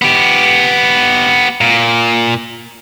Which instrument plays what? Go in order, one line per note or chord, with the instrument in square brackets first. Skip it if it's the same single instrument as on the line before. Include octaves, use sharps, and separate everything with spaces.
[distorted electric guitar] B3 G4
A#2